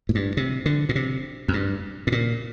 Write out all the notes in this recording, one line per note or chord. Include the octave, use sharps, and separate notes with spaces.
A2
G2
C3
D3
A#2
C3
F2
G2
A2
A#2